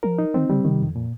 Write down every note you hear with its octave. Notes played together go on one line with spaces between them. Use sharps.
F3 A#4
D#4
D#3 C4
C#3 G3
C3 D#3
F2
A#2